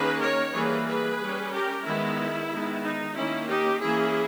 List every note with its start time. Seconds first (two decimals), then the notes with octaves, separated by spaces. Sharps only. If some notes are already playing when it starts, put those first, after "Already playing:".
Already playing: D#3 A#3 C#4 G#4 B4
0.21 A#4 C#5
0.54 E3 G3 A#3 G#4 B4
0.87 G#4 B4
1.20 G3 C#4
1.53 G4 A#4
1.85 D#3 G#3 B3 E4
2.51 D#3 G#3 B3
2.84 D#4
3.16 D#3 A#3 C#4 E4
3.49 D#4 G4
3.82 E3 A#3 C#4 E4 G#4